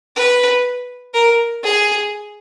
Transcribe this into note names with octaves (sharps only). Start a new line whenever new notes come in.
B4
A#4
G#4